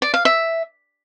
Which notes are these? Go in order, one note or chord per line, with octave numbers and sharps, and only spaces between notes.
D5
F5
E5